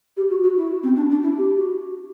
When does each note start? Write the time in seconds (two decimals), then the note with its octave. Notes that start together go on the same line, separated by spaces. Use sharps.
0.17 G4
0.30 F#4
0.43 F#4
0.57 E4
0.83 C4
0.96 D4
1.11 D4
1.23 E4
1.38 G4
1.56 F#4